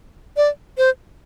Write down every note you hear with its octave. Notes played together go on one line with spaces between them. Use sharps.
D5
C5